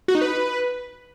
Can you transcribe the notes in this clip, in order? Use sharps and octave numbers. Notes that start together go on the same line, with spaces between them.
F#4
D#4
B4